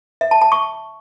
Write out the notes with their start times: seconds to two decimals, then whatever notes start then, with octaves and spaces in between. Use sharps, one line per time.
0.21 E5
0.31 A5
0.42 A5
0.52 C#6